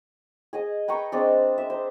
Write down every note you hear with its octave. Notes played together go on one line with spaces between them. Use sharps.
G#4 D#5 G#5
B4 G5 A#5 C#6
G#3 C4 D4
E5
C5